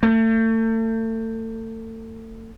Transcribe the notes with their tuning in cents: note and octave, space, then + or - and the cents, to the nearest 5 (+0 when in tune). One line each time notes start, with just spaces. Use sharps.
A3 +35